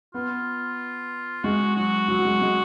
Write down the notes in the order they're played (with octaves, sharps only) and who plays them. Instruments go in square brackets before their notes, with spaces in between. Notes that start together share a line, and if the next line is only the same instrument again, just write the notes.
[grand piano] B3 [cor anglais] F4
[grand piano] G#3 [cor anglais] F#4
[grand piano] F#3 [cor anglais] F#4
[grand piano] F#3
F#3
G#3
G#3